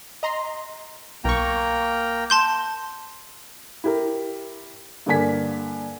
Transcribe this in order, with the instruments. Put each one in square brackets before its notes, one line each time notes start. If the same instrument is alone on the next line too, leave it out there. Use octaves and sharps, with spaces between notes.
[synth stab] D#5 A#5 C6
[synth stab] B1 C#6 [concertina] A#3 G5 A#5
[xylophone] A5 C6 G6
[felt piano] E4 G4 A#4
G2 D3 A#3 D5 G#5 B6